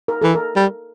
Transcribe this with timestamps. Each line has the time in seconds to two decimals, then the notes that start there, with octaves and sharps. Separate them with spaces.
0.08 A#4
0.22 E3 A4
0.35 A#4
0.56 G3